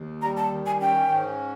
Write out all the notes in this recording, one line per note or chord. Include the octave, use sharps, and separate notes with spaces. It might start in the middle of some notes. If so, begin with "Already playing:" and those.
Already playing: D#2
G3 A#5
A5
D#3
G#5
C#4 G5
G#2